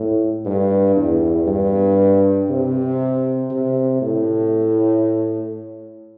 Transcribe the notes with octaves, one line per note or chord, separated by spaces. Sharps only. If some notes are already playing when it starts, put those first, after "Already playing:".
Already playing: A2
G2
E2
G2
C3
C3
A2